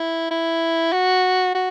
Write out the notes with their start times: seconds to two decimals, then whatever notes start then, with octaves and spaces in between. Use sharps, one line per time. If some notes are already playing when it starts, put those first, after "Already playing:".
Already playing: E4
0.31 E4
0.92 F#4
1.54 F#4